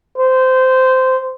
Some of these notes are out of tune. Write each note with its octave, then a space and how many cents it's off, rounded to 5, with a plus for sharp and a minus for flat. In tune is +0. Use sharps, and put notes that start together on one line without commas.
C5 -15